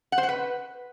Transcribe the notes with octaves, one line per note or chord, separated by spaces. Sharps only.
F#5
C5
F#5
B4